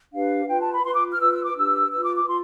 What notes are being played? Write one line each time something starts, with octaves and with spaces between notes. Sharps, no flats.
D4 G4 B4 F5
F4 B4 G5
A5
B5
F4 B4 C6
D6
F6
F4 B4 E6
E6
D6
D4 G4 B4 E6
F4 B4 E6
D6
D6
F4 C6